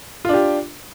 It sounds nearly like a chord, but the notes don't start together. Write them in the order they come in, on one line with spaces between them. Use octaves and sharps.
F4 D4 G4